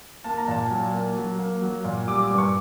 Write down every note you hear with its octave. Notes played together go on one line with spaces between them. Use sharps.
A#3 A5
A#5
A#2 A5
F#3
A#3
F#3
A#3
F#3
A#2
G3 D6
D6
G2
C#6